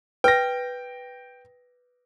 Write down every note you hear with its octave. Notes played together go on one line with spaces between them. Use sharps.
B4 G5 A#6